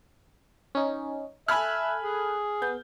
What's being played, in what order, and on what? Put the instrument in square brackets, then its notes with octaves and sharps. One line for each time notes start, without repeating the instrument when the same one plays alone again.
[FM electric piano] C#4 D#4
[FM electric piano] A4 F#6 [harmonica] E5 [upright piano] G#5 B5 F6
[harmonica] G#4
[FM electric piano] B3 [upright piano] G6